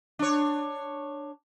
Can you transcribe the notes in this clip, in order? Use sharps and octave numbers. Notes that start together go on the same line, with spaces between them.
D4 C#5